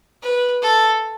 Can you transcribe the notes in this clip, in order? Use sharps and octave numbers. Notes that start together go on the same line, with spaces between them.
B4
A4